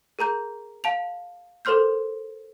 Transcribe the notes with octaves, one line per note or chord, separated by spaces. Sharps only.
G#4 A#4 A#5 G6
F5 A5 F7
A4 A#4 C5 C6 F6 G6